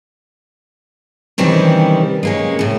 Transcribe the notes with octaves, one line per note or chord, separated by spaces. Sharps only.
C3 D#3 E3 G3 C#4
G#3 A#3 C#4
A2 C#3